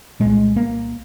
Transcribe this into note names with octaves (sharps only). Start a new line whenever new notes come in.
C2 A#2 G#3
A#3